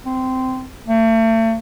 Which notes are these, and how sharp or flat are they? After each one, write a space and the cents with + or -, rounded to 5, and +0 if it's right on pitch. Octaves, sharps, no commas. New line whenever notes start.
C4 -15
A3 +40